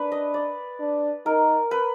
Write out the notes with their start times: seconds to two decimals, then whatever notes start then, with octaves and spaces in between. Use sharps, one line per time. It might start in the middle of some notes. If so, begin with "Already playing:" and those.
Already playing: D4 B4
0.12 D#5
0.34 D5
0.80 D4
1.26 D#4 A#4
1.71 B4